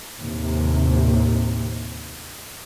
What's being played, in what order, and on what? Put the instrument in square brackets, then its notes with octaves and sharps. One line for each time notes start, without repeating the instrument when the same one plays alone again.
[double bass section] D#2 A2 C3